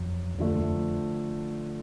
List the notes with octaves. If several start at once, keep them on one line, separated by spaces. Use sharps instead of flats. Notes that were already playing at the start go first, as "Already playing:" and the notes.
Already playing: F2 F#3
F2 D3 F3 A3
F2